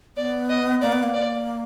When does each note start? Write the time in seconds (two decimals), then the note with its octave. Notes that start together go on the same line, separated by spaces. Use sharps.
0.17 B3 D5
0.49 D#5
0.82 A#3 D5
0.92 B3
1.03 A#3
1.14 D5